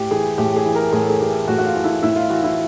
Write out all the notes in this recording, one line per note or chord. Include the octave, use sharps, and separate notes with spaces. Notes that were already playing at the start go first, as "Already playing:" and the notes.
Already playing: A2 G4
E3 G#4
A2 G4
G#4
E3
A#4
A2 G#4
A4
G#4
E3 G4
A2 F#4
F#4
F4
E3
E4
A2 E4
F4
E3 F#4
E4